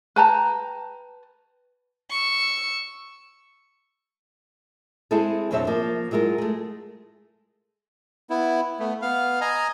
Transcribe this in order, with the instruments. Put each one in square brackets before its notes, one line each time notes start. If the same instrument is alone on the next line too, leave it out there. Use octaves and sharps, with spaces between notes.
[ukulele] B4 G5 A5 A#5
[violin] C#6 E6
[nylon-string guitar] G#3 C4 E4 G#4 A4
F2 B2 F#3 C4 D4 E5
F3 A#3
F#3 G#3 E4 F4 A#4
G#3 A3
[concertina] B3 E4
A3 B3
B3 F5
D#5 G#5 A#5